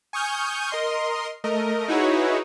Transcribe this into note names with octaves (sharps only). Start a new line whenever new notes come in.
G#5 C#6 D#6 F6 G6
A#4 D#5 C6
A3 A#4 D#5
D#4 E4 F#4 G#4 B4 C#5